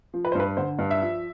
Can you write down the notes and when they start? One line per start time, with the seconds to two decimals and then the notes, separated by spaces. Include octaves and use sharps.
0.14 F3
0.25 B4
0.32 C5
0.35 G2 B4
0.57 D3 C5
0.79 G2
0.91 E5
1.02 F3